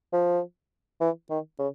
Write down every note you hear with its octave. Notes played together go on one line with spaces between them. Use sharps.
F3
E3
D#3
C#3